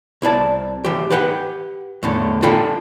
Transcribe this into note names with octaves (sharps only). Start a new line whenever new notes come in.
C2 E4 D5 A5
E3 G4
G4 B4 F#5 G5
E2 A2 D3
D4 F4 A4 A#4 G5 B5